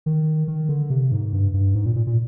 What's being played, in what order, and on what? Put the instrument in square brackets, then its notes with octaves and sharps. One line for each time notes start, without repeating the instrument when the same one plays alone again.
[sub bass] D#3
D#3
D3
C3
G#2
G2
G2
G#2
A#2
A#2
A#2